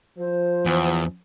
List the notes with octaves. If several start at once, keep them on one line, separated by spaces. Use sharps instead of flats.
F3 C5
E2